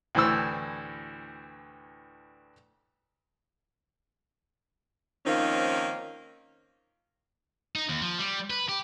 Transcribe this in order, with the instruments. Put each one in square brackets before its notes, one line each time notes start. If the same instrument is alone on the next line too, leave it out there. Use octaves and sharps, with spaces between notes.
[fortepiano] D2 A2 E3 C5 E6
[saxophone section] D#3 F3 A#3 C4 C#4 D#4
[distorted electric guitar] D#4
D#2
F3
G3
B4
G4